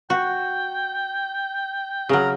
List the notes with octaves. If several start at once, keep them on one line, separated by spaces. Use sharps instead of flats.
F#4 G5
C#3 F#3 A#4